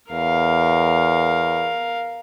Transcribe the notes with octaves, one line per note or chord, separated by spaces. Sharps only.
E2 A#4 F5